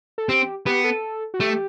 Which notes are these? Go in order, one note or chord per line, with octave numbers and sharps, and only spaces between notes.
A4
C4 G4
B3 G4
A4
F#4
A3 G4